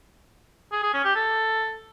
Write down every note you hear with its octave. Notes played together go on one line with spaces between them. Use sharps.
G#4
G#4
C#4
G4
A4